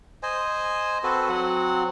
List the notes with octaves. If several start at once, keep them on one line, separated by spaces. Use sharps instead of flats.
C5 D#5 G#5
C4 F#4 A4 B4
F#3 C4 F#5